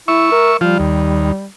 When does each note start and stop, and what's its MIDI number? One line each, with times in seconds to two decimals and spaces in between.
0.08 0.31 64
0.08 0.57 76
0.08 0.57 85
0.32 0.55 70
0.61 0.78 53
0.61 1.47 55
0.61 0.78 65
0.80 1.32 39